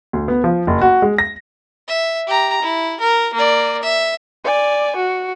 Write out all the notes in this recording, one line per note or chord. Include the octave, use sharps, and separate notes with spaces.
D2
B3
F3
F#1
F#4
G#3
A#6
E5
G4 A#5
E4
A#4
A#3 D5
E5
D5 G#5
F#4